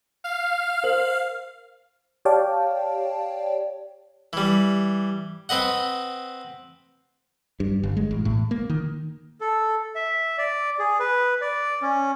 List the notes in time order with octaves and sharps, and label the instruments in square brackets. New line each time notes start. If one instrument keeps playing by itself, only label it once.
[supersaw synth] F5
[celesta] A#4 C5 F#7
[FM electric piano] G4 C#5 D5 F5 G5 A5
[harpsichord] E3 G3
C4 B4 D#5 F#5
[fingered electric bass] G2
G1
G#3
A1
A2
A#3
D#3
[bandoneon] A4
E5
D5
G#4
B4
D5
C#4